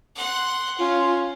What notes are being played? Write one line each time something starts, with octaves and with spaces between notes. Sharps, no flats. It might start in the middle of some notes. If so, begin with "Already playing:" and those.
F#5 C6
C#4 F4